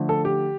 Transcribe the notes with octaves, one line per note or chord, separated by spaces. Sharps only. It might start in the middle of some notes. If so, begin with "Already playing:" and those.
Already playing: D3 F3 A3
A4
G4